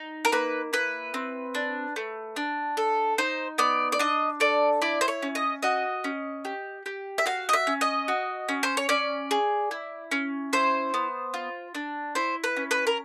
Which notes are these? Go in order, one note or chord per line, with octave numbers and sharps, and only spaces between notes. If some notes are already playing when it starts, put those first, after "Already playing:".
Already playing: D#4
A#4
A#3 B4
E4 B4
C4
D4
A3
D4
A4
D#4 C5
B3 D5
D5
D4 D#5
A4 D5
E4 D5
C5
C#5
C#4
D#5
F#4 D#5
C#4
G4
G4
E5
F#4 F5
D#5
E5
C#4
D#5
F#4
C#4
C5
C#5
C#4 D5
G#4
E4
C#4
E4 C5
B3
F4
D4
E4 C5
B4
C#4
B4
A#4